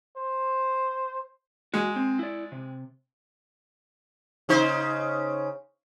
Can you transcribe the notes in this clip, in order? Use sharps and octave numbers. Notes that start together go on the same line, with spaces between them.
C5
G#3 F#4
C4
E4 D5
C3
C#3 D#4 C5